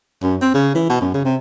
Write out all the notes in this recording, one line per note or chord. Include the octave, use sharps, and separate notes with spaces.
F#2
C4
C#3
E3
B2
F#2
C#3
C3